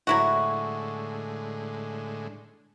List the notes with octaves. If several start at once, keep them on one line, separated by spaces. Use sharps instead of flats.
A2 D3 F#3 G#3 E4 F#4